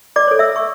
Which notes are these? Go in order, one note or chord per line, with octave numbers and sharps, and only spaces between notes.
D5 D6
A4 C#5
E5 E6
C#6